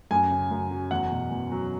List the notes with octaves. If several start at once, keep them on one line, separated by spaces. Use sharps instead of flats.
F#2 G#5
C#3
F#2
F#3
E2 F#5
B2
E2
F#3